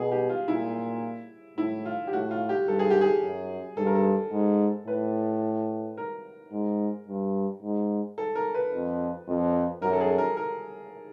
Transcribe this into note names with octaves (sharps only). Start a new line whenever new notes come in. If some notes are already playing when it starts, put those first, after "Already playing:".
Already playing: B2 G#4
G4
F4
A#2 E4
A2 E4
F4
G4
A2 F#4
F4
G4
G2 A4
G#4
G4
G#4
F#2
G2 A4
A#4
A4
G#2
A2 B4
A#4
G#2
G2
G#2
A4
A#4
B4
F2
F2
F#2 A#4
A4
G#4
A#4
A#4